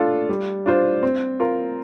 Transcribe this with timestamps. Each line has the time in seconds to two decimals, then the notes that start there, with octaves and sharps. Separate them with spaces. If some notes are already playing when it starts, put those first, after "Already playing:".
Already playing: A3 D4 F4 A4
0.29 G3
0.66 D4 F4 C5
1.03 C4
1.40 F4 A#4